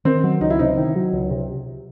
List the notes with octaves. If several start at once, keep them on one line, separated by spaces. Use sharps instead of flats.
D#3 C4
F#3
C#2 D#4
E4
C3 D#4
D#3
F#3
C#2
C3